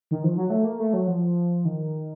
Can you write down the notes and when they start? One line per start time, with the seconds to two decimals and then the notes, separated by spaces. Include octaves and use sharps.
0.11 D#3
0.24 F3
0.37 F#3
0.50 A3
0.64 A#3
0.79 A3
0.93 F#3
1.07 F3
1.65 D#3